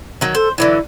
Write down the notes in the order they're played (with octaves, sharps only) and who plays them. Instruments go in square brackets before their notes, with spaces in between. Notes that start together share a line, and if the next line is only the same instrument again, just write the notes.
[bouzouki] D#3 F#3
[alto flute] A4 [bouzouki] C5
[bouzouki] D3 E3 F#3 [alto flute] E4